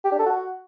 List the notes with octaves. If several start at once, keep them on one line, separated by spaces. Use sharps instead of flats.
G4
D4
A4
F#4